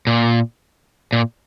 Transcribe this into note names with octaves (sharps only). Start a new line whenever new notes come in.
A#2
A#2